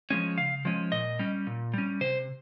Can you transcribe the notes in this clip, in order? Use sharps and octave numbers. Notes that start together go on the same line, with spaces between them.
F3 G#3 C#4
C#3 F5
F3 G#3 C#4
A#2 D#5
G3 C#4
A#2
G3 C#4
C3 C5